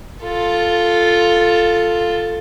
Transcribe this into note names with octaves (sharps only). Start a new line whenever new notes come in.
F4 A4